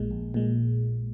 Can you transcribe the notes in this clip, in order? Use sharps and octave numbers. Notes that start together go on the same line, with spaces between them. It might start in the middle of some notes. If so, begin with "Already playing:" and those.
Already playing: A#1 A#2 G#3
A#1
A#2 G#3